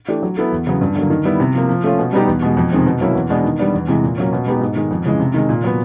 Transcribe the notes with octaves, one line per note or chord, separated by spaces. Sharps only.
E3 A3 D4 G4
F#3
B3 E4 A4
E2
C#3 F#3 B3
G2
D3 F#3 A#3
D#3
G3 B3 E4
C3
F3 A#3
F3
A3 C#4 F4
B2
G3 B3 D#4 G4
E2
B2 G#3
F2
C3 D#3 G#3 C4
B2
F#3 A#3 C#4 E4
E2
B2 G#3 B3 D4
D#3
G3 B3 D4
E2
C3 E3 G#3
A#2
F#3 A#3 C#4
B2
G#3 B3 D#4 G4
G#2
D#3 G#3
F2
C#3 E3 G#3
C3
D#3 G#3
A#2
F#3 B3